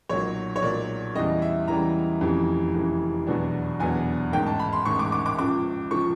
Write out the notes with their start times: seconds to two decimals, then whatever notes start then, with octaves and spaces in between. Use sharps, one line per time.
0.09 B1 A#2 F#3 C#5
0.56 C#5
0.62 B1 A#2 F#3 D5
1.15 E2 C#3 E3 G3 D#5
1.42 E5
1.68 E2 C#3 E3 G3 A#5
2.21 F1 F2 C#3 E3
2.74 F1 F2 C#3 E3
3.27 E2 B2 F#3 B3 D4
3.80 E2 B2 F#3 B3 D4 G#5
4.33 A1 G#2 D#3 G5
4.46 A5
4.59 B5
4.73 C6
4.85 A1 G#2 D#3 C#6
4.99 D6
5.12 D6
5.26 D6
5.39 C#2 C#3 F3 D6
5.91 C#3 F3 C#6